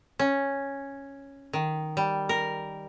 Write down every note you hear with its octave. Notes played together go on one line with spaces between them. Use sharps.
C#4
D#3
G3
A#4